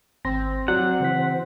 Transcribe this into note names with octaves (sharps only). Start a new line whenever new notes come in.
G#1 C4 A#6
F#3 D5 F#5
C#3 E3 B6